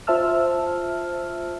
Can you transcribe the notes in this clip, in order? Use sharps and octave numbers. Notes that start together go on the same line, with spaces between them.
F4 C5 E5 A5 E6 F6